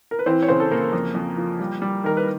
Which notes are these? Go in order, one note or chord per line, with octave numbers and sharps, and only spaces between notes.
A#4
B4
E3 C4 C5
C#5
C#3 C4 C5
A4
C#3 A#3 A#4
F2
F2
F3
G3
G3
D#3 A#4
B4